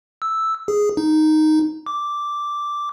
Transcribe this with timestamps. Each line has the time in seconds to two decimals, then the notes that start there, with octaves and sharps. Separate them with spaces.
0.22 E6
0.68 G#4
0.97 D#4
1.86 D6